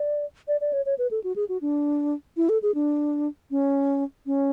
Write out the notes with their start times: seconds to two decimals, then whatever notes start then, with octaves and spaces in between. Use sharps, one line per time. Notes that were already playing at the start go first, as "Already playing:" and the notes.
Already playing: D5
0.48 D5
0.61 D5
0.73 C#5
0.86 C#5
0.98 B4
1.11 A4
1.24 F#4
1.36 G#4
1.49 F#4
1.61 D4
2.37 E4
2.49 A4
2.62 G#4
2.75 D4
3.51 C#4
4.26 C#4